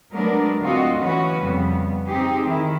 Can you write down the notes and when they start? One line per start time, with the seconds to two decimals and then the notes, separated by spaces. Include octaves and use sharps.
0.13 F#3 G#3 A3 B3 D4 A#4
0.61 D2 C4 F4 F#4 D#5
0.98 E3 B3 C#4 F#4 B4
1.39 F2 C#3 G3 B3
2.06 C4 D#4 G4 G#4
2.46 D#3 E4